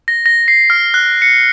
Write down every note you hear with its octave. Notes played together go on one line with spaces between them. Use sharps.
A#6
A#6
C7
F6
F#6
C#7